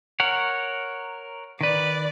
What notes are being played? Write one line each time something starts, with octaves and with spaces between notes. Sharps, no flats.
A#4 C#5 F#5
D#3 B4 D5